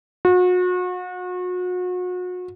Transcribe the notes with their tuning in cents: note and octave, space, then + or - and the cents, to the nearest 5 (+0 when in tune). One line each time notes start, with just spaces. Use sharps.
F#4 -35